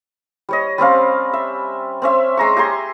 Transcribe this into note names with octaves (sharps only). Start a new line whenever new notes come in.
G3 C#5 D#5
G3 C4 C#4 F5
E5
C4 C#4 E5
G#3 A#5 C#6
G4 G#5 A#5 C6